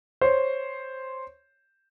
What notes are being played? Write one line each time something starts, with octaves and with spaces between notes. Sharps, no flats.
C5 C#5